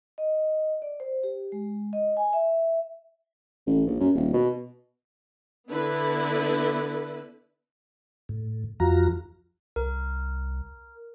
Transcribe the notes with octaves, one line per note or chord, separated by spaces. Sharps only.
D#5
D5
C5
G4
G#3
D#5
G#5
E5
A1
A#1
F#2
D#1
B2
D3 B3 E4 B4
A2
F2 F3 F4 F#4 A#5
C2 A#4